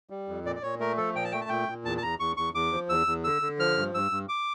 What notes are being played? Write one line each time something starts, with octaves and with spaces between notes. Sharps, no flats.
G3
F2
A#2 D5
D5
A#2 C#5
A3 A#4
F3 A4
A#2 G5
A5
A3 G5
A5
A#2 G5
A#2
E2 A5
A5
E2 A#5
E2 C#6
E2 C#6
E2 D6
F3
E2 E6
E2
D3 E6
D3
F3 F6
G2
G2 E6
G2
D6